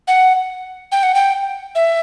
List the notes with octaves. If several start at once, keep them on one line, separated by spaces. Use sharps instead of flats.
F#5
G5
F#5
G5
E5